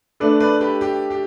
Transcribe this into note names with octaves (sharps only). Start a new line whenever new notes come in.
A3 D4 A4 B4 D5
B4 D5
G4 B4
G4
G4